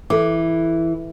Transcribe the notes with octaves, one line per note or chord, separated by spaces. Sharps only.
E3 A4 D6